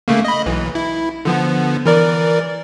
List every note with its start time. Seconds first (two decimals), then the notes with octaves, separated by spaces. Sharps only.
0.08 C#3 A3 A#3
0.25 D#5 B5
0.46 B1 E3
0.75 E4
1.25 D3 F3 B3
1.86 E3 A#4 D5